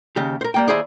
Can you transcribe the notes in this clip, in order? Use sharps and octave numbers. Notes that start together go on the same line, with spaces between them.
D#2 C#3 G4
A#4 C5
G3 A#3 G5
D#2 D#3 E4 G#4 C5 D5